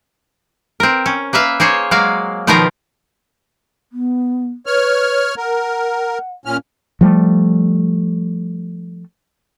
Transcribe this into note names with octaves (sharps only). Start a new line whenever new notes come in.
C4 A#4
C#4
A#3 B4 E5 F5
A#3 G#4 C5 C#5
F#3 G#3 A#3 D5 F5
B2 D#3 F3 B3 F4 A#4
B3
B4 C#5 F6
A#4 F#5
A#2 C#4 F6
F3 G3 A3